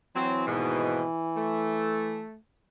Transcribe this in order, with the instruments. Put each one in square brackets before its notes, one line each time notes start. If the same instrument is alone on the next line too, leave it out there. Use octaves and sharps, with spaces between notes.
[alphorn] E3 [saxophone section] F#3 C4
[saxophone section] D#2 G#2 B2
A3